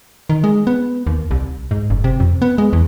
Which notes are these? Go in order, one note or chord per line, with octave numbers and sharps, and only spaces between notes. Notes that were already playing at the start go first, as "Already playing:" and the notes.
D#3
G#3
B3
D#2
C2
G#2
F#1
C3
F2
B3
G#3
E2